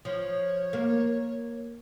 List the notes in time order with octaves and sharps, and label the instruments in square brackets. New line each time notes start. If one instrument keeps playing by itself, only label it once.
[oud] F3 [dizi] C#5
[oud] A#3